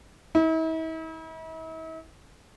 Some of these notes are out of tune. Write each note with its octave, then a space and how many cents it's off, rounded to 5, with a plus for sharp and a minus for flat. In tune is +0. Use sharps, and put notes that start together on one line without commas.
E4 -45